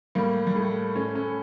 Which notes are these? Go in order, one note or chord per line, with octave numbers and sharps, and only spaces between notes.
A2 G3 A#3
G3
A2 A3
A2 A3 C#4
A3 C#4